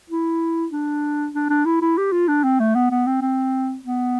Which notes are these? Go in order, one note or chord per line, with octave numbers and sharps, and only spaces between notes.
E4
D4
D4
D4
E4
E4
G4
F4
D4
C4
A3
B3
B3
C4
C4
B3